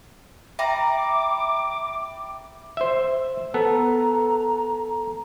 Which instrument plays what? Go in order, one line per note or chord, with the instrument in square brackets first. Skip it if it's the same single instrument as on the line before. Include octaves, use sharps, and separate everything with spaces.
[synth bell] E5 G5 B5 [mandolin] A#5 [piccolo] D6
[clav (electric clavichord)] C5 E5
[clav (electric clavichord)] B3 [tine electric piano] A4 [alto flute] A#5